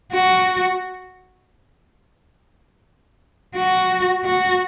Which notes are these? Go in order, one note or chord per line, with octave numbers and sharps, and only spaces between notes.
F#4
F#4
F#4